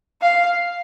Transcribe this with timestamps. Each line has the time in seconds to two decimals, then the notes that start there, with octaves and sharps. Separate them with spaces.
0.21 F5